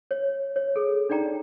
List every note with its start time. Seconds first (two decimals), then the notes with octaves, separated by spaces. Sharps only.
0.11 C#5
0.56 C#5
0.76 G#4 A4
1.09 D4 D#4 D5 G5 A#5